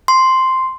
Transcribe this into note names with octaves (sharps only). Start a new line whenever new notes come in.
C6